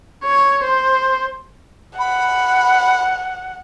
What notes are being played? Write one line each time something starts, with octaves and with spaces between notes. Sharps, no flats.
C#5
C5
F#5 B5